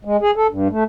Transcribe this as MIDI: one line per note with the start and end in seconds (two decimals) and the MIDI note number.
0.05 0.17 56
0.21 0.31 68
0.36 0.47 69
0.49 0.68 43
0.70 0.84 57